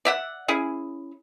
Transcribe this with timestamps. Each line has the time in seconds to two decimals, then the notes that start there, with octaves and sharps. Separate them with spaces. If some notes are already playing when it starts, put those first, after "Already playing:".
0.05 D5 E5 F#5
0.48 C#4 E4 G#4